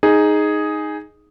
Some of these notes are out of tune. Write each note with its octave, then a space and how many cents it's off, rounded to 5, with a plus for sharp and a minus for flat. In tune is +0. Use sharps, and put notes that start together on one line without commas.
D#4 +0 G#4 +0